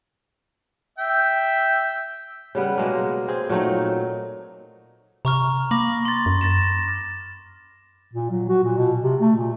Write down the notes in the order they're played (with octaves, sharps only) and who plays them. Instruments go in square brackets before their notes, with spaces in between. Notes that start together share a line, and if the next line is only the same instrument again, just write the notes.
[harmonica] E5 G5
[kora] C#3 G3 B3
B2 G#3 A#3
C4 G#4
A#2 F#3 A3 D#4
[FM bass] C3 [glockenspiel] A#5 C#6 F6
[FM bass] A#3 [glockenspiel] B5 D6 A#6
[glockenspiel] C6 A6
[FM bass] F#2
[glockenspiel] A6 A#6 E7
[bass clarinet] A#2
F#3
F#4
A#2
B2
C3
A3
A#2